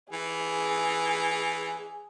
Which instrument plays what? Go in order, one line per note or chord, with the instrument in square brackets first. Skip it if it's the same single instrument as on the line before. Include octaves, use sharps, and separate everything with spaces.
[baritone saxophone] E3 [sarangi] G#4